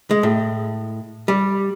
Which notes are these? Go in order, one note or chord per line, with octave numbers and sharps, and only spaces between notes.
G#3
A2
G3